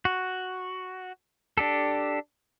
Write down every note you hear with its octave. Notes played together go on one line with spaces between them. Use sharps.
F#4
D4 G4 A4